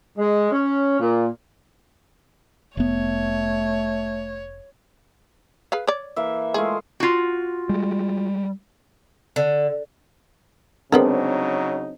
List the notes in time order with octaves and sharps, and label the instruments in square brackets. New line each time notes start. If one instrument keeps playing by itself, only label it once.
[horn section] G#3
C#4
A#2
[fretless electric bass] F1 B3 [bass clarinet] A3 [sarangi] C#5
[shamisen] G#4 B4 F5
C#5 D5
[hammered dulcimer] E3 A#3 E5
[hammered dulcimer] G#3 A3 F4 [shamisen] G#4
[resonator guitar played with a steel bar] F4 F#4
[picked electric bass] G3 G#3
[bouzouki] D3
[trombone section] C#3 F#3 D#4 [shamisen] G#3 B3 A#4 [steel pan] C4 D4